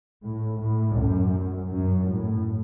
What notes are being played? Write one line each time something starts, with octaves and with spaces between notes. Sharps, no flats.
A2
A2
F#2
F#2
A2